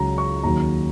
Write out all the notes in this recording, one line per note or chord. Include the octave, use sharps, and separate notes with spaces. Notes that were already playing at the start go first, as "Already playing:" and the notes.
Already playing: C#2 C#3 F#3 A#5
C#6
D#2 D#3 F#3 A#5